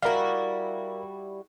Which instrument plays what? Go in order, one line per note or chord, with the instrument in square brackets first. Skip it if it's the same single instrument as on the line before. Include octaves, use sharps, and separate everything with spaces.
[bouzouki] G3 E4 F#4 [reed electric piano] A#4 F5